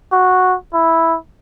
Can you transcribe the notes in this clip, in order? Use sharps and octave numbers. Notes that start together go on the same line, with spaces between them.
F#4
E4